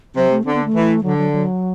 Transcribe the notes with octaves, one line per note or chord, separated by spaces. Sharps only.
C3 F#3
A3
D3 C4
B3
A3
E3
D3 F#3
F#3
F#3